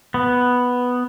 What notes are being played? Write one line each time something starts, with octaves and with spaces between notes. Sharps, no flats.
B3